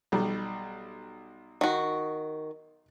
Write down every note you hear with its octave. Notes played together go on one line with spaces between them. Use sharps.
B1 G3
D#3 F#4